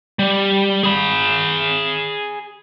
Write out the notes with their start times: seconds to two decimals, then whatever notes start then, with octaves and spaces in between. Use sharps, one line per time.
0.19 G3
0.83 G#4 B5